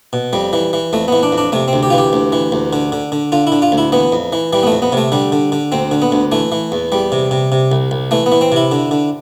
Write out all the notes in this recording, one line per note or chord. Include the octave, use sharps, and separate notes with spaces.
B2
F2 G3
E3
E3
F2 A3
E3 B3
D4
F2
D4
C3 A3
C4
D2
G4
E3 F4
G4
D2
E3
D2
D3
D3
D3
D3 F4
E4
D3
F4
D2
E4
E3 B3
F2
E3
E3 G3
B3
A3
F2
B3
C3 A3
D3 G3
D3
D3
D2 C4
D3
B3
D2
E3 A3
E3
E2
E2 G3
C3
C3
C3
C2
C2
E3 A3
B3
E3
C4
C3 E4
D3
D3